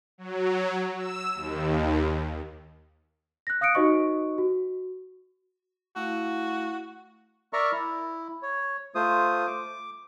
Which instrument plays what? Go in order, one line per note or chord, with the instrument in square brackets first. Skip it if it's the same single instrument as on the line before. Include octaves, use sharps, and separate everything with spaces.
[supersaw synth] F#3
E6
D#2
[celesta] F#6 A#6
F5 D#6 F#6 C#7 D7
D#4 F#4 C5 D#5 C#6
F#4
[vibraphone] A3 E4 F5 [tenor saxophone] F#4
[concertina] A#4 D5 E5 A#5 C#6 F6
E4
C#5
A3 F4 C5 D#6
D6